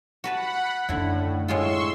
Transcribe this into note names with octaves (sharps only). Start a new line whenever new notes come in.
F#4 B4 F#5 A5 B5
F#2 A2 D3 D#3 E4
A2 G#3 F4 C6 C#6 E6